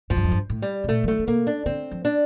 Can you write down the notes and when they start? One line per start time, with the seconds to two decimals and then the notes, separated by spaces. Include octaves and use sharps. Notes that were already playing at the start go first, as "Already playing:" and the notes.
0.10 A2 F3
0.17 G2
0.24 F2
0.32 G2
0.50 A2
0.62 G3
0.84 C3
0.88 A#2 A3
1.04 F3
1.08 E3 A3
1.19 D3
1.27 C3 A#3
1.47 D4
1.66 D3 C4
1.91 F3
2.05 D4